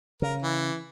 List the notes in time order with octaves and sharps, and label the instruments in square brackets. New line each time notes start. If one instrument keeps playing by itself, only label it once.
[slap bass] C#3 [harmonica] A#4
[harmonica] E3